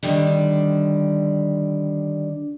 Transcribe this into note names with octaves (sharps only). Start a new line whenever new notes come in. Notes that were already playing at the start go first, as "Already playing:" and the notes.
D3 D#3 G3 D4